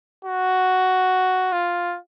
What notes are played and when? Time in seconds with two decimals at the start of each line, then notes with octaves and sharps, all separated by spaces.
0.25 F#4
1.53 F4